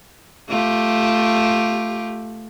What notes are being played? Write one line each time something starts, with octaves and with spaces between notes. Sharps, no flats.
A3 F4 G4